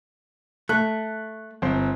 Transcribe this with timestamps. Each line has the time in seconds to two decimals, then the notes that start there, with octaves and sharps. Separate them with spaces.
0.69 A3 F#6
1.62 G1 C4 C5